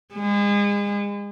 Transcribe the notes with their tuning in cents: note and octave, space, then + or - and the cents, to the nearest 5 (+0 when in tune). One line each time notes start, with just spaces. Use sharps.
G#3 -35